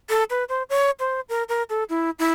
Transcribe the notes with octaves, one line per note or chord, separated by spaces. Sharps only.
A4
B4
C5
C#5
C5
A#4
A#4
A4
E4
E4